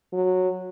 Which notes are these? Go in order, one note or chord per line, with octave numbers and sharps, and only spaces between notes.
F#3